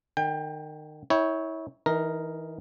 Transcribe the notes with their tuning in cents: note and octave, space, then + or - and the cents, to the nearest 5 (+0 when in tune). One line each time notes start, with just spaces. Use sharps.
D#3 -30 G5 +25
E4 -30 C#5 +0 G5 +0
E3 -25 D#4 +0 A#4 +0